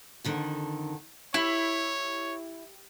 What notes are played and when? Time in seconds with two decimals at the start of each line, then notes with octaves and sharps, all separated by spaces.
0.24 F2 D3 D#3
1.34 E4 G4 C#5